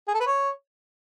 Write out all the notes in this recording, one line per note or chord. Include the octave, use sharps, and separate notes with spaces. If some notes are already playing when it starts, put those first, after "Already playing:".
G#4
A4
B4
C#5